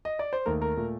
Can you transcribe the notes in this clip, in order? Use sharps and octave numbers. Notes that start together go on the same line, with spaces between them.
D#5
D5
C5
D#2 D#3 A3 A#4
A#4
A#2 A3